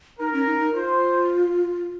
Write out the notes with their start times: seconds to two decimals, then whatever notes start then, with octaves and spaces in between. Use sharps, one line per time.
0.19 D#4 A#4
0.33 C#4
0.47 D#4
0.60 D#4
0.74 F4 C5